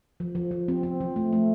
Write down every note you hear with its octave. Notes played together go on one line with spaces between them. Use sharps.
F3
F3
F3
C4
C4
F3
A3
A3